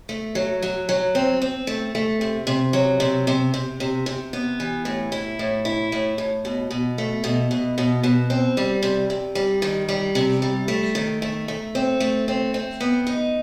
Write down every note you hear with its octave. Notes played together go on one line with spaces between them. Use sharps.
A3
F#3
F#3
F#3
C4
C4
A3
A3
C3
C3
F#3
C3
C3
C3
C3
C3
B3
E3
A2
E4
A2
E4
A2
A2
B2
B2
A3
B2
B2
B2
B2
C4
G3
C3
C3
G3
D#3
G3
C3
G3
A3
D#3
A3
A3
C4
A3
C4
C4
B3
D#4